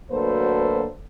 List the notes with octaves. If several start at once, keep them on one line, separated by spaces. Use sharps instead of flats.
D2 F#3 A#3 A4 B4 C5